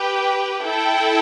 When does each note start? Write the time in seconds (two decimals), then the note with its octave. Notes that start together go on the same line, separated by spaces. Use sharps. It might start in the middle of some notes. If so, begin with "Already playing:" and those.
Already playing: G4 B4 G5
0.64 E4 A4 G5